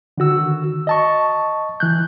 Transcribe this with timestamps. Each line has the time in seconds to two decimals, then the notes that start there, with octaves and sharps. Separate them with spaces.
0.18 D3 D#3 F#4 E6
0.87 D#5 A5 C#6
1.80 E3 F#6 G6